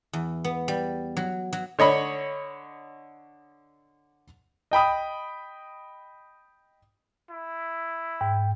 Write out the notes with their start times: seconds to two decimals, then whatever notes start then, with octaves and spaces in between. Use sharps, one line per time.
0.13 E2
0.44 B3
0.68 G3
1.17 F#3
1.53 F#3
1.79 D3 C#5 D#5 B5
4.71 D#5 G5 B5 D#6
7.30 E4
8.21 G#2 G5